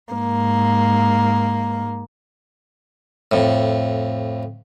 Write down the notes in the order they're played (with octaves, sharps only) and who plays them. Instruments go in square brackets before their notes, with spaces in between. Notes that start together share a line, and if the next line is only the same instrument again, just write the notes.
[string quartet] G#2 A#3
[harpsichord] F2 A2